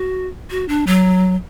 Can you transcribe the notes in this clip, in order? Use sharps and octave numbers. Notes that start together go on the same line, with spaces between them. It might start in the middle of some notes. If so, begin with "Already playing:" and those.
Already playing: F#4
F#4
D4
F#3